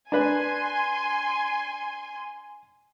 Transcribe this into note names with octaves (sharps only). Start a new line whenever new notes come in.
D4 B4 G#5 C6